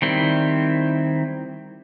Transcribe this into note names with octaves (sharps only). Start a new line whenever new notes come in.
D#3 G3 C4 E4